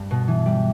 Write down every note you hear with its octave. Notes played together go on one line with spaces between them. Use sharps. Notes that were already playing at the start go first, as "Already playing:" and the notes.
Already playing: G2
B2
E3
G3